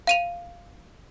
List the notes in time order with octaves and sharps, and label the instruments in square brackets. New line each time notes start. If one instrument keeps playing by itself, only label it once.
[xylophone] F5 D#7 F7